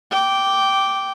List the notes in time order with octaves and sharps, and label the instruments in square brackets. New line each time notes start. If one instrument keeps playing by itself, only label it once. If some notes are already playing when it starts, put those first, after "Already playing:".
[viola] G5 D6